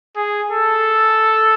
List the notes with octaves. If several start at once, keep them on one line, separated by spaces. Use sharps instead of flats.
G#4
A4